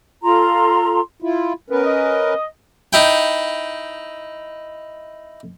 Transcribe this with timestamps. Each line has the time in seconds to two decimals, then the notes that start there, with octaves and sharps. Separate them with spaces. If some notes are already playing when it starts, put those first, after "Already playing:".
0.23 F4 A4 A#5 C6
1.22 E4 F4
1.70 B3 C#4 A#4 B4
1.84 D#5
2.93 D#4 E4 G5